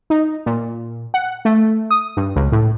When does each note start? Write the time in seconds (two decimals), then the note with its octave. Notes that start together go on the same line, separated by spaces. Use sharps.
0.10 D#4
0.46 A#2
1.14 F#5
1.45 A3
1.91 D#6
2.17 G2
2.36 C#2
2.52 A2